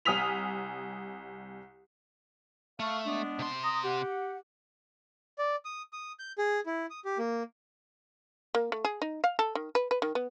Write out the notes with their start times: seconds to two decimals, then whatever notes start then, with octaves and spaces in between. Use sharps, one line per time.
0.05 C2 G#5 D#6 F6 B6 F7
2.80 A3 F5 C#6
3.05 G#3 B3 D4
3.39 C3 C6
3.63 A#5 D#6
3.84 G4 F#5
5.38 D5
5.65 D#6
5.93 D#6
6.19 G6
6.38 G#4
6.66 E4
6.90 D#6
7.05 G4
7.18 A#3
8.55 A#3
8.72 A3
8.85 G#4
9.02 D#4
9.24 F5
9.39 A4
9.55 D#3
9.75 B4
9.91 B4
10.02 D#3
10.15 B3